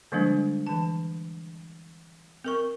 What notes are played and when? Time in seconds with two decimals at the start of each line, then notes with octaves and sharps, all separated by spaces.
0.12 D3 F3 G3 G#3 A#3 D4
0.67 E3 A5
2.44 C4 A#4 C#6